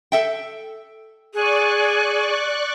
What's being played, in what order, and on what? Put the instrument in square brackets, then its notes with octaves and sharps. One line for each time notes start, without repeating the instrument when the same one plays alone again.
[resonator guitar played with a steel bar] A4 E5 G5
[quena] G#4 [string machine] D5 C#6 F#6